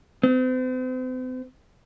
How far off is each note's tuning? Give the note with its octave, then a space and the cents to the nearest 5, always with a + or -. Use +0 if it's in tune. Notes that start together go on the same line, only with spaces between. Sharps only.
C4 -40